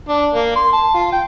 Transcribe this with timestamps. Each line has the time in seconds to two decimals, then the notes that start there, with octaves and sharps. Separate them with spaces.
0.09 D4
0.35 A#3
0.56 C6
0.73 A5
0.94 F4
1.12 G5